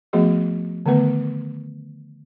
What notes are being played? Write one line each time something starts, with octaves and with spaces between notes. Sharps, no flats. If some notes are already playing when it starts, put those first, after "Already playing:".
F3 A3 B3 F#4 G#4 D#5
D3 D#3 A3 B3 B4